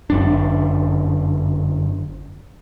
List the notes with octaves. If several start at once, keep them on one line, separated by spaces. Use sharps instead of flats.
G1 F#2 D4